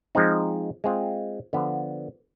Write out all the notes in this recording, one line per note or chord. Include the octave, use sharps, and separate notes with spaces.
F3 G#3 C4 D#4
G#3 C4 F4
D3 F3 B3